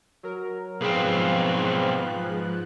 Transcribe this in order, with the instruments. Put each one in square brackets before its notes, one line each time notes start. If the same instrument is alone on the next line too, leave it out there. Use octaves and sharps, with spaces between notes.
[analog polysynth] F#3 A#4
[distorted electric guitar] B1 C4 [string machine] G#2 F3 F#6 [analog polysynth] G#4 B4 F5